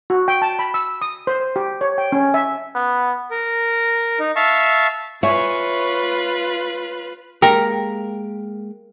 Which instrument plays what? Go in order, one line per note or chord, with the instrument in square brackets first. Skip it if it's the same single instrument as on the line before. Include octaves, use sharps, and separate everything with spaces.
[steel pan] F#4
G5
A5
B5
E6
D#6
C5
G4
C#5
G5
C#4
E5
[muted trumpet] B3
[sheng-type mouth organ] A#4
D#4
E5 F5 A5 C#6
[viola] F4 B4 [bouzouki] C#5 G#5 [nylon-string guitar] E5
[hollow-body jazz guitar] G#3 A#3 G4 [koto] A#4 [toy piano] G5